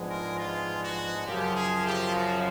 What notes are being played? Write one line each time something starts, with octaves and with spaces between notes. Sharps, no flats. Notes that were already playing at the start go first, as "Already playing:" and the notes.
Already playing: G#2 F3 G#3 B3 D4
A#4
F4
F#4
F#2 C#3 F3 G4
G#4
G4
F#4